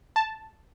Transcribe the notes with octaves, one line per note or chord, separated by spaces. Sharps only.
A5